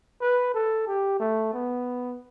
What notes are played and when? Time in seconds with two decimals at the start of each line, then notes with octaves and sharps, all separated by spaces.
0.21 B4
0.54 A4
0.87 G4
1.20 A3
1.53 B3